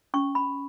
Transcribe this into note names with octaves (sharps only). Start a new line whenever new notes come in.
C#4 C#6
B5